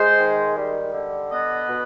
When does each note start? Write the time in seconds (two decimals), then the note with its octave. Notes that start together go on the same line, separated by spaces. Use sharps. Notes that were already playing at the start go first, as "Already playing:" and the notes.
Already playing: G#3 C5
0.19 D#3
0.56 G3
0.94 D3
1.32 B3 D#5
1.69 B2